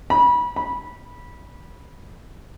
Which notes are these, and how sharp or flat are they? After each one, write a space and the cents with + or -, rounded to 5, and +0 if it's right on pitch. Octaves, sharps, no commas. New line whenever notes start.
B5 -25
B5 -15